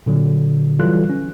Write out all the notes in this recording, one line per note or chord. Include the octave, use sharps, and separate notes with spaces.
A#2 D3 F#3
E3 F#3 G3 F4 A4 F#6
C#4